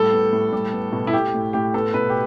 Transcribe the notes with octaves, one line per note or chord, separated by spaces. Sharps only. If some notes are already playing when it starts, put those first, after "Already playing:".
Already playing: A2 G3 A4
B3
A2
G3
B3
B2
E4
A3 G4
A2
A2 G4
B3 A4
B2 B4
G4